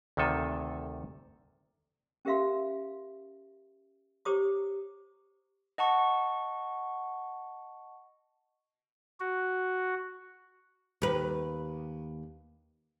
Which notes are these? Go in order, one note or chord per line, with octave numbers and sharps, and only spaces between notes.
D2 C3 D#3 A4 G#5
C#4 G4 A#4 E5 F5 C6
G4 C5 C#5 A#5 D6 D#6
D#5 F#5 A5 C#6
F#4
D#2 B4